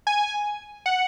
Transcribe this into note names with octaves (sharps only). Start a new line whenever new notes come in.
G#5
F#5